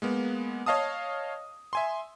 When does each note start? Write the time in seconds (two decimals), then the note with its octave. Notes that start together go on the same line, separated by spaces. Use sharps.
0.02 G#3 A#3 B3
0.66 C#5 D#5 F5 A5 D#6
1.73 E5 G#5 C6